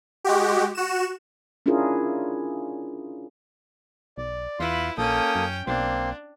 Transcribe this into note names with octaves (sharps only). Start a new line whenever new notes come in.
G#3 F#4 G4
F#4 E7
C#4 D4 E4 F4 G#4 A#4
B1 D5
E2 E4 F4 B4 C6
A#1 A#3 C#4 A4 G5 D#6
F#2
B1 A#3 C4 D4 C6